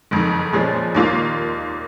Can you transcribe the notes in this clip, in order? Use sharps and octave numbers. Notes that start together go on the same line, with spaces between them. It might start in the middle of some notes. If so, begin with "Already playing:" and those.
F#1 F2 D#3
A#2 F3 G#3 C#4
D#2 D#3 A#3 F4